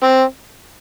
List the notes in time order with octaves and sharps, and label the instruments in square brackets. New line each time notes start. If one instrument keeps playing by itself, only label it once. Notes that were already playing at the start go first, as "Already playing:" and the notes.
[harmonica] C4